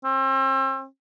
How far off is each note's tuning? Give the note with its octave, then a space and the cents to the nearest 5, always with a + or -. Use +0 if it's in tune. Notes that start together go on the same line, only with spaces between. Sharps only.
C4 +40